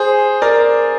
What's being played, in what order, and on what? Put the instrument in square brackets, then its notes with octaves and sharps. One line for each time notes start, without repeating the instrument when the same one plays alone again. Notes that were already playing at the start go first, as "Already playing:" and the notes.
Already playing: [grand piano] G#4 C5
A#4 D5